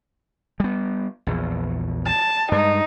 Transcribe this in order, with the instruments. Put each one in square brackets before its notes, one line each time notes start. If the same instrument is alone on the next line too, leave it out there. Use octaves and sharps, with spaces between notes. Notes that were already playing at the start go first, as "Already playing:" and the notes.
[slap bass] G3 B3
A#1 E2
[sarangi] A5
[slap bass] G2 G#3 [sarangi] D#4